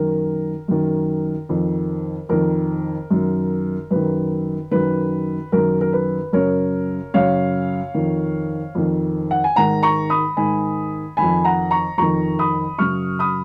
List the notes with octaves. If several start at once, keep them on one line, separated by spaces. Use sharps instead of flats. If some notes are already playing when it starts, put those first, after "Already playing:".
Already playing: F#2 D#3 A#4
F#2 D#3
F2 D#3
F2 D#3 A#4
F#2 D#3
F#2 D#3 B4
F#2 D#3 B4
F#2 D#3 A#4
A#4
B4
F#2 C#3 A#4 C#5
F#2 C#3 C#5 F5
F2 D#3
F2 D#3
F#5
G#5
G#2 D#3 F#5 A#5
A#5 C#6
B5 D#6
G#2 D#3 G#5 B5
F2 D#3 G#5 B5
F#5 A#5
A#5 C#6
F2 D#3 A#5 C#6
B5 D#6
F#2 C#3 C#6 F6
B5 D#6